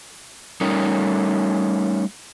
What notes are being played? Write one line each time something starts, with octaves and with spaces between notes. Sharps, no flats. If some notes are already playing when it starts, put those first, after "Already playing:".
G3 A3 C#4 D#4 A#4